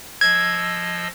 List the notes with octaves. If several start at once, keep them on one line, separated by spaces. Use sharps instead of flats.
F3 D#5 E6 G#6